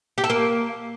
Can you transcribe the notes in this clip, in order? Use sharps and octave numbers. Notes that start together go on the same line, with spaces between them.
G4
A4
A#3